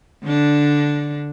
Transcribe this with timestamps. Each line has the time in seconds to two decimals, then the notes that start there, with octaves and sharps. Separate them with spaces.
0.25 D3 D4